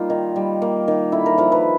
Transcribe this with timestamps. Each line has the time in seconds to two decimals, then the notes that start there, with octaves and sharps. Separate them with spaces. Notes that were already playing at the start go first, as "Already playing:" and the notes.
Already playing: G3 A#3 D#4 F4
0.10 D#3
0.36 G3
0.62 A#3
0.88 D#3
1.12 D3 E4
1.26 A#4
1.38 F3 A#4
1.52 B4